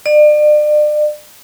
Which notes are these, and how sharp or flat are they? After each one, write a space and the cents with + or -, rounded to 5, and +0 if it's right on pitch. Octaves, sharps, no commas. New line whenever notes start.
D5 +35